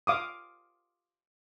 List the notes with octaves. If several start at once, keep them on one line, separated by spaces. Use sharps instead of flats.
F5 D6 D#6